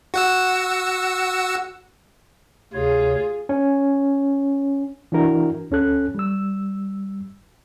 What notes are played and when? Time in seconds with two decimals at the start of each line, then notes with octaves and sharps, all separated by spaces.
0.14 F#4 F#5 E6
2.73 D2 C3 F4 G#4 C#5
3.49 C#4
5.12 E3 D4 E4 F#4 A#4
5.71 D2 C#4 A4 F#6
6.15 G3 E6